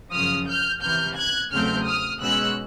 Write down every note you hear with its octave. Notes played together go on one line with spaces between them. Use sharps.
F#2 C#3 F3 D#6 F6
F6 G6
C#2 C3 E3 F6 G6
F#6 G#6
E2 C#3 F#3 A3 C4 F6 G6
D#6 F6
B2 G#3 C#4 E6 F#6